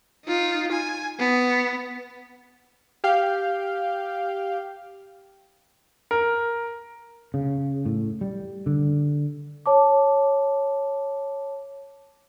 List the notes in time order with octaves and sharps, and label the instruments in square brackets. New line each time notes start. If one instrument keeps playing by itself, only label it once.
[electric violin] D#4 F4
G#5
B3
[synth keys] G4 F5 G5
[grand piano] A#4
[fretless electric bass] C#3
A2
G3
D3
[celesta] C#5 A5 D6